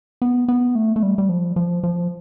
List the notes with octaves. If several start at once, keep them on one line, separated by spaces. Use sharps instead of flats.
B3
B3
A3
A3
G3
G3
F3
F3
F3